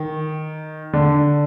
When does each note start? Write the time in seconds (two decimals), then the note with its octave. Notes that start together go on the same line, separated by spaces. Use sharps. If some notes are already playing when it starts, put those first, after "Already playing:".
Already playing: D#3
0.93 D3